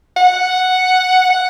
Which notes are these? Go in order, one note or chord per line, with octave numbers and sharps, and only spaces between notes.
F#5
F#5